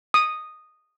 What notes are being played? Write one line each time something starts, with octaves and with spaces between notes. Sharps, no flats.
D#6